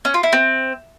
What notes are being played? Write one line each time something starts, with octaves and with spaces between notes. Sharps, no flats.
C#4
F4
E4
C4